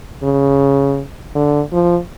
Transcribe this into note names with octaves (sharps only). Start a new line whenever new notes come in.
C#3
D3
F3